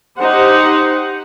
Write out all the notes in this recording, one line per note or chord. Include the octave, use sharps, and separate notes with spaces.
D#4 G4 C5 F#5